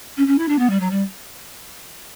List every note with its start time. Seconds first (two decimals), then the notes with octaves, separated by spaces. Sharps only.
0.17 C#4
0.27 C#4
0.38 E4
0.48 D4
0.58 B3
0.69 G3
0.80 F#3
0.90 G3